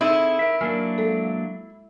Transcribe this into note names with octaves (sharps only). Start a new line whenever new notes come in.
C4 D#4 E4 G#4 A4
A#4 E5
F#3 A#3 D4 A#4 G#5 F6
G#3 A4